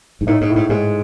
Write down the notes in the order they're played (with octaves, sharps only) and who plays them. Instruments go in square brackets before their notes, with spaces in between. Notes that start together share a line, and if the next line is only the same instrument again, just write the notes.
[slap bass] G#2
[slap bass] A2 [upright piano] D#4
[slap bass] G#2
[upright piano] A2
[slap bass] G#2
[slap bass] G#2 [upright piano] G#3